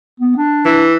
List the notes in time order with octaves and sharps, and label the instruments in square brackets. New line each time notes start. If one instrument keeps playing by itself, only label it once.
[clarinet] B3
D4
[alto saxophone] E3